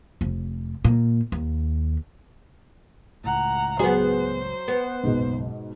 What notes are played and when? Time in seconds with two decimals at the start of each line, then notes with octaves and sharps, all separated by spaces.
0.21 F1
0.85 A#2
1.32 D#2
3.24 C#2 A2 F#5 A#5
3.79 F#3 B3 G#4 C5
4.68 B3
5.03 F#1 B1 G#2 B2